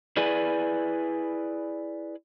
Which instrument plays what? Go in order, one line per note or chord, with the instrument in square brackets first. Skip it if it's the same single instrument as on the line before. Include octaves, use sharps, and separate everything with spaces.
[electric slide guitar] E4 G#4 B4 D5 G#5